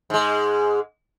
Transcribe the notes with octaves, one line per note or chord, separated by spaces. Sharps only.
G#2 G#3